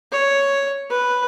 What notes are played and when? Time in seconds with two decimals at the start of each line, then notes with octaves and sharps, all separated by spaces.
0.12 C#5
0.90 B4